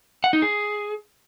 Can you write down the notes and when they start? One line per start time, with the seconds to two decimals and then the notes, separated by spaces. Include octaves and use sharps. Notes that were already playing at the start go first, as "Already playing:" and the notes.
0.24 F#5
0.33 D#4
0.42 G#4